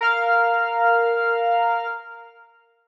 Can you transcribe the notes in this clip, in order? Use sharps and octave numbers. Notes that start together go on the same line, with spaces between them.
A#4 F5 F6